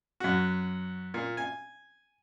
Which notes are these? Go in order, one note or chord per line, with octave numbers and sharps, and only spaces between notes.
F#2 F#4
A#2
G#5